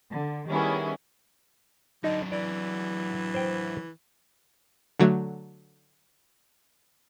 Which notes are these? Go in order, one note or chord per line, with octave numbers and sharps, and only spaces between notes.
D3
D#3 G3 B3 C#4 E4 G#4
D3 F#3 D4 D#4
E3 D5
C5 G5
D3 F#3 A3